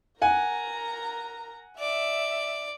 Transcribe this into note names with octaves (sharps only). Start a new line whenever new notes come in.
A#4 F#5 G#5 A#5
D5 E5